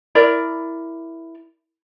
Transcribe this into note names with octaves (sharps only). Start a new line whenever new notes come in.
E4 A#4 D5